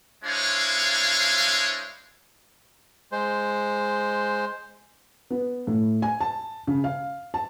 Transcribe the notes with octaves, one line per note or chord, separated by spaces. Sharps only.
G#3 D4 E4 C5 C#5 F5
G#3 C5
B3
A2
G#5
A5
C#3
F5
A5